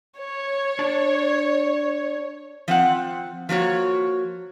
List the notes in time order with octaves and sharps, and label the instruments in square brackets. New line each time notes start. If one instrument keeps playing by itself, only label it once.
[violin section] C#5
[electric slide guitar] D4 A5 [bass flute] D5
[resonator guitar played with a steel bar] F3 C4 F#5
F3 A#3 F#4 C#5